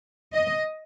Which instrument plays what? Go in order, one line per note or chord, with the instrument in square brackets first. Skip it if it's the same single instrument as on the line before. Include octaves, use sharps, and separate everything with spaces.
[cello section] D#5